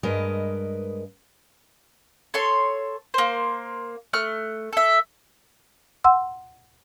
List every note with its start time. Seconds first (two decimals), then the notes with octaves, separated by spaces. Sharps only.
0.03 G2 G#3 A#4 B4 D#5
2.34 A4 C#5 C6
3.14 A#3 C5
4.13 A3 F6 F#6
4.73 A4 E5
6.04 F#5 C6 E6